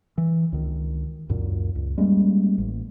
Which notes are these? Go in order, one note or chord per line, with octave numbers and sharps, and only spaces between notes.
E3
C#2 D#3
C#2 F#2 A#2
C#2
G3 G#3 A#3 C#4
A1